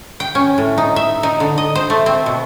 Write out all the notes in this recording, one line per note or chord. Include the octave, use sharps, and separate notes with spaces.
G5
C#4
A2
D#4
E5
D#4
D3
D#5
C5
A3
C4
B2